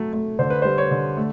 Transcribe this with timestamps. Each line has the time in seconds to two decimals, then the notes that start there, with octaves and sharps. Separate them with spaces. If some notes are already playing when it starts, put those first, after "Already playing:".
Already playing: F#3 A3
0.13 A3
0.39 D3 C5
0.50 B4
0.62 G3 C5
0.78 C#5
0.91 D3
1.17 A3